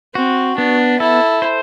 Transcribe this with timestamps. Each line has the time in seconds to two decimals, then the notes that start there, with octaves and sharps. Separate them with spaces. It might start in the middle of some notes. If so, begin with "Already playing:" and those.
0.15 C4 F#4
0.57 B3 D4
1.00 E4 A4
1.42 C5